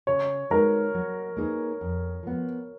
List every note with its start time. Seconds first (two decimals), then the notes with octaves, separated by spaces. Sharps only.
0.07 C#3 C#5
0.50 G#3 D#4 F#4 A#4 B4
0.94 F#3
1.37 A#3 D#4 G#4 B4
1.81 F2
2.23 F3 B3